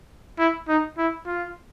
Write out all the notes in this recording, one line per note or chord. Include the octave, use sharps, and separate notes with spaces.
E4
D#4
E4
F4